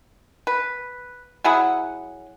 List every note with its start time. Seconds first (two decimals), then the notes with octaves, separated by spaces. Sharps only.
0.47 B4
1.44 F#3 E4 G#4 F#5